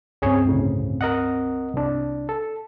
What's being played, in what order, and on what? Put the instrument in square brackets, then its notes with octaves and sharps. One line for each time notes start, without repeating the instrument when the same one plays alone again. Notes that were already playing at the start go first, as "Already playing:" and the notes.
[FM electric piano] C#2 G2 C4 [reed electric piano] C#4 G#4 C#5
[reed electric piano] D2 A2 C#3
A#4 D#5 F#5
C2 D4
A4